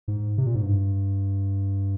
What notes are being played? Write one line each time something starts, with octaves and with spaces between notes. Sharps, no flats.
G#2
C3
A#2
G#2
G2